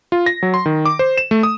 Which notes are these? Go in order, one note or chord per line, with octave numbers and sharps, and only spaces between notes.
F4
A#6
F#3
C6
D#3
D6
C5
E7
A3
D#6